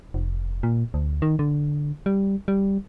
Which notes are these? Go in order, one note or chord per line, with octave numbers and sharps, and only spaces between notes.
F1
A#2
D2
D#3
D3
G3
G3